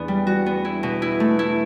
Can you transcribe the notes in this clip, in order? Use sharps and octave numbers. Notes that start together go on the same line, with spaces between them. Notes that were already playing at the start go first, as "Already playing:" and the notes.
Already playing: E2 B3 D4
G3
F#4
B3
E4
B2
E4
A3
E4